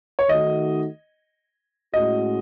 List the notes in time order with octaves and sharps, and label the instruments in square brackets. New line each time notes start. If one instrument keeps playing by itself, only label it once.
[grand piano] C#5
[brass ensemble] D#3 A3 D#4 F#4 [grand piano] D#5
[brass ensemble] A2 G#3 C#4 F#4 [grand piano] D#5